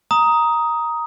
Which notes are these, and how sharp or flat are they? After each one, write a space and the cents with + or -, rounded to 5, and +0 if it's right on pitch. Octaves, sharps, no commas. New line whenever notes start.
A#5 +5 D#6 +10